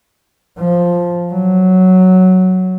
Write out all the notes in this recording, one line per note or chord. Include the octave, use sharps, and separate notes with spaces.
F3
F#3